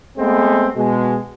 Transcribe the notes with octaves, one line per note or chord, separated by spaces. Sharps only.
G#3 A3 B3 C4
B2 G#3